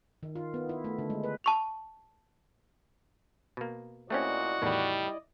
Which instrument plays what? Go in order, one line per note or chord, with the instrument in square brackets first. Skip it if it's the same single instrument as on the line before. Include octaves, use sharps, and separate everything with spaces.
[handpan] D#3
F4
B3
E4
A3
D3
G#3
B4
[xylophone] A5 C#6 F7
[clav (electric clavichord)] B2 A#3
[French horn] A#2 [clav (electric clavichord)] A3 C4 C#4 [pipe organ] E4 D5 D#5 [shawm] F#4
[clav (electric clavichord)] E2 A2 D#3 [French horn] G3